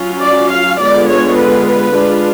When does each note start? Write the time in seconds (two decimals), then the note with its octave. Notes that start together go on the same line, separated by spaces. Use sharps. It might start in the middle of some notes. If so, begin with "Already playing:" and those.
Already playing: F#3 C#4 F4
0.22 D5
0.51 F5
0.80 D3 G#3 B3 F4 D5
1.09 C#5
1.38 B4
1.67 B4
1.96 G#3 D4 F4